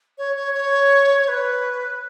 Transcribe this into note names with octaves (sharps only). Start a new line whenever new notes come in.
C#5
C#5
C#5
C#5
B4